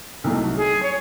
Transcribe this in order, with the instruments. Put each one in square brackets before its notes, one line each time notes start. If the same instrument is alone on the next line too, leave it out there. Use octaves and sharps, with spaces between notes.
[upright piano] C2 C3 F#3 A3 D#4
[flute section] G#4
C#5